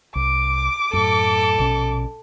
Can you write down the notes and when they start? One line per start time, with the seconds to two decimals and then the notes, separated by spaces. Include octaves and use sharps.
0.15 C2 D6
0.93 F#2 A2 A4
1.58 A#1 B2 C#4